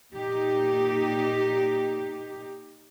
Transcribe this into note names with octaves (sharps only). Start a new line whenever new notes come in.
A#2 D#4 G4